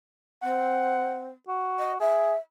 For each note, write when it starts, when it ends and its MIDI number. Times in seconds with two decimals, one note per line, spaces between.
0.43 1.29 60
0.43 1.28 78
1.48 1.99 66
1.79 1.92 75
2.00 2.33 68
2.00 2.36 76